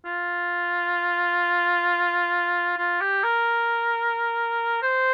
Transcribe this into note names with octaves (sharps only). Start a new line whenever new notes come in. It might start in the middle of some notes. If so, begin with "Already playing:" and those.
F4
F4
G4
A#4
C5